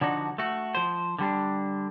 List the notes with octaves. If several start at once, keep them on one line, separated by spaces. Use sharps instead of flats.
D3 F3 D4 D#4 F#4
A3 F#4
F3 C5
D3 G3 D4